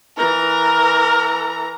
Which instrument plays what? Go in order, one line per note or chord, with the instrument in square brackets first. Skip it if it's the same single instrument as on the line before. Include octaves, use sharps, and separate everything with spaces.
[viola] E3 A#5 [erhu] A#4